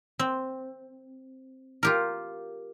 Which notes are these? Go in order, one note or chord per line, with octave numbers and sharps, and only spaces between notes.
C4
F4 G4 A#4